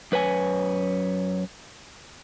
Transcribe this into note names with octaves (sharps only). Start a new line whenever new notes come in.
F#2 B4 C#5 G#5